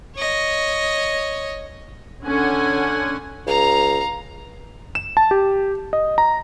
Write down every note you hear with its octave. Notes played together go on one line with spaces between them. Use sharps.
C#5 D#5
D3 C#4 F#5 G#5
C#2 F5 A#5
E7
A5
G4
D#5
A#5